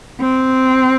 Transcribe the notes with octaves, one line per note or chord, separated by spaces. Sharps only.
C4